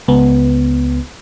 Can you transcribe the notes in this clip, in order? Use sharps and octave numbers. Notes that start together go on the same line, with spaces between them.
C#2 B3